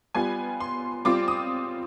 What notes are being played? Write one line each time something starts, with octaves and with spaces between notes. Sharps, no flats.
G3 B3 F4 G#5
C6
G3 C4 F4 D6
D#6